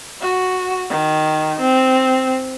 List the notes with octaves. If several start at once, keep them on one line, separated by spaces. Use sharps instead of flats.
F#4
D#3
C4